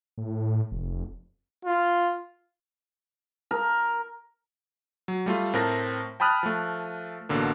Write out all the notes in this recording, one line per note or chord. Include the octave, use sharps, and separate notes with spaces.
A2
F1
F4
A#4
F#3
G3 A3 F4
A2 C4 A#4 A5 A#6
G5 A5 B5 D#6 F6 F#6
F3 A3
A1 B2 D3 A#3